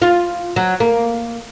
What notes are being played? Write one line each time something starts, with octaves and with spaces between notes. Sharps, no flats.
F4
F#3
A#3